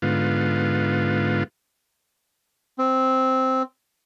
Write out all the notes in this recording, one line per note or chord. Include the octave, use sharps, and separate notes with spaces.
G#2 D3 B3 F4
C4